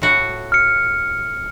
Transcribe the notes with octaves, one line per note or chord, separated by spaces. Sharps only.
A2 F#4
F6 C#7